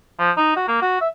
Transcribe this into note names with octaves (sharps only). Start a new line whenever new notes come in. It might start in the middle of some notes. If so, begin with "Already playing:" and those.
F3
D#4
F#4
A#3
F#4
E5